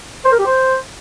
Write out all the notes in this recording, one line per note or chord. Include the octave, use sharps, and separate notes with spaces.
C5
A#4
G4
C5